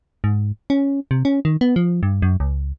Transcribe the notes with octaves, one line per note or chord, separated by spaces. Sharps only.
G#2
C#4
C3
C#4
D#3
B3
F3
G2
F#2
C#2